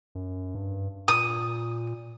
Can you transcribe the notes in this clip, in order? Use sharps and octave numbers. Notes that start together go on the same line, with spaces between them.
F#2
G2
A#2 D#6